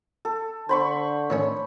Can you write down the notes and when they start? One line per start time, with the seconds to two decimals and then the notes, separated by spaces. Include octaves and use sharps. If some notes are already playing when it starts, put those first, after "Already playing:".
0.25 A4
0.69 D3 C5 B5 C#6
1.30 A2 D#3 C#4